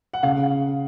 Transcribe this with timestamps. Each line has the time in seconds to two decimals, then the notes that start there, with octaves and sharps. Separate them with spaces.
0.13 F#5
0.23 C#3 F5